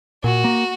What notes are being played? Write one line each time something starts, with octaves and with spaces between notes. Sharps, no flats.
A#2 F#4
A#3